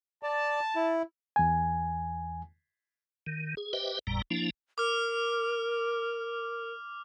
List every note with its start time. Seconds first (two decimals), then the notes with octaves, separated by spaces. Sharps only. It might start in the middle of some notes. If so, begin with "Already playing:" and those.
0.23 D5 A5
0.75 E4
1.36 E2 G#5
3.27 D#3
3.57 G#4
3.73 G4 B4 C5 D#5 E5 G5
4.07 G1 E2 A2 G3 A#5
4.31 F3 A#3 D4 E4
4.78 A#4 D6 F6